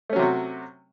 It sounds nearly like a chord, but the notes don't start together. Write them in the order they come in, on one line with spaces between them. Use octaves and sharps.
A3 C#4 F#3 C3 F#4